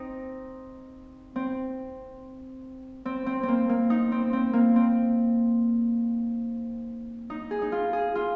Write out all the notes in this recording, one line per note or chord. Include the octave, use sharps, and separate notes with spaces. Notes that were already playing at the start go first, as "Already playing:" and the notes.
Already playing: C4 D#4
C4
C4
C4
C4
A#3
A#3
D#4
C4
C4
A#3
C4
D#4
G#4
D#4
F4
G#4
F4